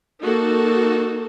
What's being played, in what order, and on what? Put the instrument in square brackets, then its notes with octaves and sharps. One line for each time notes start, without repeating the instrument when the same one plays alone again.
[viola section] A#3 D#4 F#4 A4